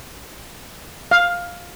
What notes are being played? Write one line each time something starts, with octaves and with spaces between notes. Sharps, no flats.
F5